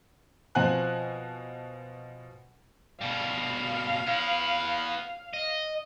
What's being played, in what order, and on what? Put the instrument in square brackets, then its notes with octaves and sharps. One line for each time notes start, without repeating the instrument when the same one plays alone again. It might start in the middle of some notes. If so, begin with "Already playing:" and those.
[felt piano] B2 F3 C4 F#5 G#5 F#6
[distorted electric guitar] B2 G3 [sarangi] F5
[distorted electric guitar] B3 E4
D#5